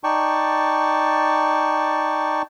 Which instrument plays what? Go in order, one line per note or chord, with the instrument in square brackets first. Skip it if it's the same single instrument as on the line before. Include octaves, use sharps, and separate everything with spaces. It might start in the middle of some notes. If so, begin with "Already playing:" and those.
[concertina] D#4 D5 G5 A5 C#6